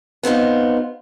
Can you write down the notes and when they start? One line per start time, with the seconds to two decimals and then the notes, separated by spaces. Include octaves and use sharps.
0.23 B3 C4 D#4 F4